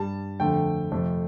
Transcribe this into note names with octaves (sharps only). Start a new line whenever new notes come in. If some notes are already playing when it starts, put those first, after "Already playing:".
Already playing: G2 G3 A5
F2 D3 A3 G5
F2 C3 A3